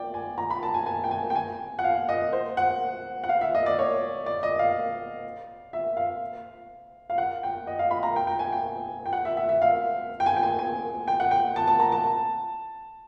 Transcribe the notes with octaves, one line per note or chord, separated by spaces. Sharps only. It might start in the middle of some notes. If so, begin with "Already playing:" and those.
Already playing: D5 G5
G#5
A#5
B5
A5
G#5
G#5
G5
G#5
G5
G#5
F#5
F5
D#5
C5
F#5
F#5
F5
E5
D#5
D5
C#5
D5
D#5
F5
E5
F5
F5
F#5
G5
D#5
F5
B5
A#5
G5
G5
G#5
G5
G5
F#5
E5
E5
E5
F5
G5
G#5
G5
G#5
G#5
G5
F#5
G5
A5
A5
A#5
A5